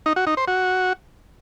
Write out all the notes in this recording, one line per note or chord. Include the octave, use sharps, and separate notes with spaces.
D#4
F#4
D#4
C5
F#4